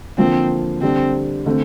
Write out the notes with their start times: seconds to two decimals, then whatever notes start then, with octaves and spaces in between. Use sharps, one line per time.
0.18 D3 F3 A#3 C4 F4
0.82 D3 G3 C4 D4
1.46 D3 A3 C4